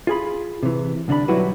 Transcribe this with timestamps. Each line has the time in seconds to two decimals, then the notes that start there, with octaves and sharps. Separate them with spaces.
0.07 F4 G#4 B5
0.63 C3 E3
1.08 C2 D3 D4 D5 B5
1.28 B1 F#3 G3 E4 F#4 B4